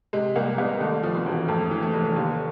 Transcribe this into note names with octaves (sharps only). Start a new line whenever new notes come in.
C3 G#3
C2 A#3
C2 B3
D#2 A3
F3
B3
E1
F2 A3
E3
A3
F1
D#2